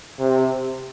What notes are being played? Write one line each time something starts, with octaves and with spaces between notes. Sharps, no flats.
C3